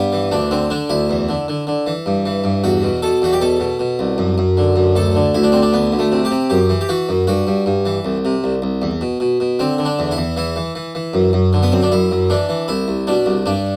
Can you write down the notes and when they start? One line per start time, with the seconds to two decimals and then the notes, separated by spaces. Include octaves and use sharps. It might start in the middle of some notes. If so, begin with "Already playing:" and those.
Already playing: G2 B3
0.13 E3
0.31 D2 D4
0.51 D3 C4
0.70 D3 D4
0.90 D2 E4
1.10 E2
1.29 D3
1.48 D3
1.67 D3
1.87 E3
2.06 G2
2.26 E3
2.44 G2
2.64 E2 F#4
2.83 B2
3.03 B2 A4
3.22 E2 F#4
3.33 G4
3.41 B2 A4
3.60 B2
3.79 B2
3.99 C2
4.18 F#2
4.38 F#2
4.57 D3
4.76 F#2
4.96 D2 A4
5.15 D3
5.34 D2 E4
5.43 D4
5.52 D3 C4
5.62 D4
5.73 D2 B3
5.92 D2
5.99 A3
6.12 C3
6.25 G4
6.31 C3
6.50 F#2 G4
6.69 E3
6.81 G4
6.89 E3 F#4
7.09 F#2
7.27 G2 F#4
7.47 G2
7.66 G2
7.86 E3
8.05 C2
8.25 C3
8.44 C2
8.62 C2
8.82 E2
9.01 B2
9.20 B2
9.40 B2
9.59 D3 C4
9.78 D3
9.85 D4
9.99 E2
10.11 E4
10.17 E2
10.37 E3 E4
10.56 E3
10.75 E3
10.95 E3
11.14 F#2
11.33 F#2
11.53 D3
11.63 B3
11.72 F#2 C4
11.82 D4
11.92 F#2 E4
12.11 F#2
12.30 E3 D4
12.49 E3
12.68 C2 E4
12.88 C2
13.07 B2 D4
13.26 C2
13.46 G2 D4